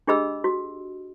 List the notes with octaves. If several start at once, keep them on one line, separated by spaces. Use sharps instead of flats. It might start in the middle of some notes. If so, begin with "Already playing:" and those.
D4 G4 G#4 D#5 B5 E6
F#4